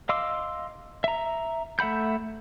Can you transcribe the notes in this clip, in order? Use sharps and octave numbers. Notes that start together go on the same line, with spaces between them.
D#5 F5 C6 D6 E6
E5 A#5
A3 E5 F#5 B5 G6